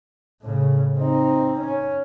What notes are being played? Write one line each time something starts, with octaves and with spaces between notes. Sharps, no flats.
A2 C#3
C4 D#4
C#4